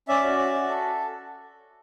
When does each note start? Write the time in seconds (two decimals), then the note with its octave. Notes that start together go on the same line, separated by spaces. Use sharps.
0.08 C#4 D5 E5
0.23 F#4
0.38 C#4
0.55 F#4
0.69 A4